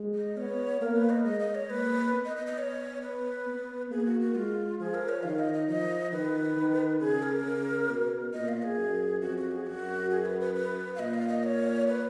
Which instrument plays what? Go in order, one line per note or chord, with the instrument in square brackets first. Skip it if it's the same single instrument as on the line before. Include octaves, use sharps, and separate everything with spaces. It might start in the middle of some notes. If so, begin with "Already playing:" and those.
Already playing: [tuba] G#3
[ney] D#5
[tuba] B3 [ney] C#5
[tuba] A#3 [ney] A#4
[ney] B4
D#5
[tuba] G#3 [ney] D#5
[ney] D#5
C#5
[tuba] A#3 [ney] B4
[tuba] B3
[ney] D#5
D#5
D#5
C#5
B4
[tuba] B3
[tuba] A#3 [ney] G#4
[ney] F#4
F#4
[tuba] G#3 [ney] F4
[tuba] F3 [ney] G#4
[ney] A#4
C#5
[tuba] D#3 [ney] F5
[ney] D#5
D#5
[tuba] F3 [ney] D#5
[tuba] D#3 [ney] B4
[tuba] D#3
[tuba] C#3 [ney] G#4
[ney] A#4
[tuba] C#3
B2
[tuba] A#2 [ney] D#5
[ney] F5
G#4
[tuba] F#2
[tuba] F2 [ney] F#4
[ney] F#4
G#4
[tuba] F#2 [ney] F#4
[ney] G#4
B4
B4
B4
F5
[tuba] A#2 [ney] D#5
[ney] F5
D#5
C#5
B4